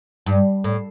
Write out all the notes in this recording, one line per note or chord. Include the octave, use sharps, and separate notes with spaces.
G2
A2